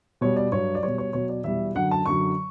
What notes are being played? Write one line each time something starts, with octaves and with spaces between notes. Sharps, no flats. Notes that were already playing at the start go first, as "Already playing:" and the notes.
B2 G3 C#5
D5
G2 F#3 C#5
D5
B2 G3 C#5
C#5
B2 F#3 C#5
D5
E2 B2 G3 E5
F#2 D3 F#3 F#5
A5
F#2 D3 F#3 C#6